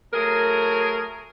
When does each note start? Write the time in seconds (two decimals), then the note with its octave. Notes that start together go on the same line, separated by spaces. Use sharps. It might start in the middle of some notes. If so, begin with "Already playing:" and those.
0.14 F#3 A3 G#4 A#4